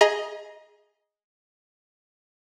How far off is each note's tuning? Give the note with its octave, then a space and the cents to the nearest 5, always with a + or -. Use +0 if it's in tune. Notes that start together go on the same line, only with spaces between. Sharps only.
G#4 +0 D#5 +0 A#5 +35